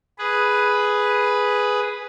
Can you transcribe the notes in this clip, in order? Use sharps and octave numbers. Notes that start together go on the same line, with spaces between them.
G#4 B4